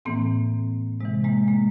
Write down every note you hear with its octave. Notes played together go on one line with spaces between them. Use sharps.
A2 E3 A#3 C4
C3 E3 G#3
G#3 A#3
G#3 A#3